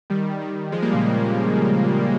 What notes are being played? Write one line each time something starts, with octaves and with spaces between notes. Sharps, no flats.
D#3 G3
D#3 G3
F3 G#3
G3 A#3
A#2 C#3